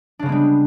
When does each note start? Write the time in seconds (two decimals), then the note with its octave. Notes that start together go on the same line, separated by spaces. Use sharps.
0.19 D4
0.23 C#3
0.26 B3
0.29 G#3
0.32 G3